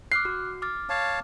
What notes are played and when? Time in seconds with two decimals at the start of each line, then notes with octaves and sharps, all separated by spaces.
0.12 D6 F6 F#6 C7
0.25 F#4
0.62 D6 F6 A6
0.89 C#5 F5 A5